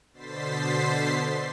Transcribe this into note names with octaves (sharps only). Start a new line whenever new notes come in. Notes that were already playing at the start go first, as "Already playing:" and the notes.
B2 D3 C5 A6 B6 C7